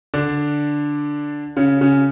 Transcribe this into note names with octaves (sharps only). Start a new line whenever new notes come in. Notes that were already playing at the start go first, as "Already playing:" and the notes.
D3 D4
C#3 C#4
C#3 C#4